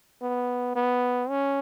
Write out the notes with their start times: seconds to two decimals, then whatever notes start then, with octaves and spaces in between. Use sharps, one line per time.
0.22 B3
0.76 B3
1.29 C#4